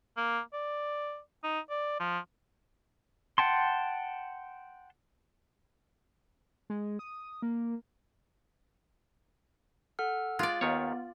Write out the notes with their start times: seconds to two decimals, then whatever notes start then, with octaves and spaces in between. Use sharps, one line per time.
0.17 A#3
0.53 D5
1.43 D#4
1.70 D5
2.00 F3
3.38 F#5 G5 A5 C6
6.70 G#3
6.99 D#6
7.42 A#3
9.99 A4 F#5 F6
10.39 G#3 F4 D5
10.61 D#2 D#3 B3 C#5